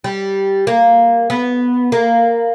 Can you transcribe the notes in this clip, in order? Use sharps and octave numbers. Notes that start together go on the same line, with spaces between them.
G3
A#3
B3
A#3